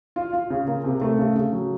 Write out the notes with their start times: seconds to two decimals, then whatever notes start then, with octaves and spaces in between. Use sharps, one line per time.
0.16 F4
0.33 F4
0.50 C#3
0.68 A#3
0.84 C3
1.02 A3
1.18 C#3
1.35 C#3
1.53 F#3